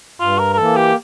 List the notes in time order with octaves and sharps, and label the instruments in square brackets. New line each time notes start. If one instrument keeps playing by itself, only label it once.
[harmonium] G2 [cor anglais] F4
[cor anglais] A#4
A#4
[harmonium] E3 A#3 [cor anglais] A4
[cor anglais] G4